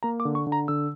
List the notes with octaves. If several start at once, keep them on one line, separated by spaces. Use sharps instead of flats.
A#3 A#5
D6
D3
C#6
D3
A#5
D3 E6